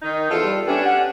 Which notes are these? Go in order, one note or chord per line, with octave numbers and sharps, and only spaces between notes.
D#3 D#4
E2 F4 A4
G3
A3 B3 C#4 D4 G4
F#5